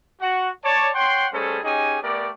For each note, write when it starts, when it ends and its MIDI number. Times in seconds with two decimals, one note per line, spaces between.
0.21 0.50 66
0.21 0.50 78
0.63 0.89 73
0.63 0.89 74
0.63 0.89 81
0.94 1.27 73
0.94 1.27 78
0.94 1.27 79
0.94 1.27 84
1.32 1.58 55
1.32 1.58 57
1.32 1.58 61
1.32 1.58 68
1.32 1.58 69
1.32 1.58 72
1.64 1.98 61
1.64 1.98 63
1.64 1.98 67
1.64 1.98 68
1.64 1.98 75
1.64 1.98 80
2.02 2.29 57
2.02 2.29 59
2.02 2.29 67
2.02 2.29 70
2.02 2.29 74